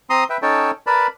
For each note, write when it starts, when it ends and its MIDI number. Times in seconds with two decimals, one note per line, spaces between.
0.10 0.24 60
0.10 0.24 82
0.10 0.24 84
0.10 0.24 87
0.30 0.37 71
0.30 0.37 76
0.30 0.37 79
0.42 0.71 61
0.42 0.71 63
0.42 0.71 69
0.42 0.71 73
0.42 0.71 79
0.42 0.71 81
0.87 1.07 70
0.87 1.07 71
0.87 1.07 74
0.87 1.07 81
0.87 1.07 83